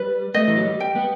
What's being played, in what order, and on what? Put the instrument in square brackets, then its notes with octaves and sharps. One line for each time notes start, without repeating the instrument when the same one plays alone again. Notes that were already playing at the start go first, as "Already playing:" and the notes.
Already playing: [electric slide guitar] G3 [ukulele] B4
[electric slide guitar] A3 [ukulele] D#5
[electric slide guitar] E3
F#3
G3
[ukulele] G5
[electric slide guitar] B3